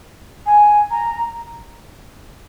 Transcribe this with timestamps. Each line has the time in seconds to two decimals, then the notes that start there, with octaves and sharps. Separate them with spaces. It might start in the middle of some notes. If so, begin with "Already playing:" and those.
0.46 G#5
0.90 A#5